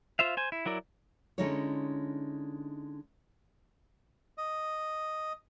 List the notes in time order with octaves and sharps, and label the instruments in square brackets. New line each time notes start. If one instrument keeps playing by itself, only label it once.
[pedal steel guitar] F4 C5 E5 F5
C5 G#5
E4
F#3 E4 A#4 D5
[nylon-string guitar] D3 G#3 C#4 D#4 E4 C#5
[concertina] D#5